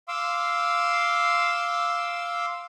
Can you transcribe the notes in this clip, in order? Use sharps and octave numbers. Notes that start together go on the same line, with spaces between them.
F5 C6 D6 E6